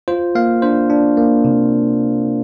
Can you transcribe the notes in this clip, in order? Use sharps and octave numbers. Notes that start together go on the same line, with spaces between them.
F4 C5
A#3 F5
D4 C5
D4
A#3
C3